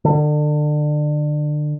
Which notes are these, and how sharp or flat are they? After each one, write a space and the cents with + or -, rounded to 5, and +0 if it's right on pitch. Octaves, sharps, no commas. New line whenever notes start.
D3 +30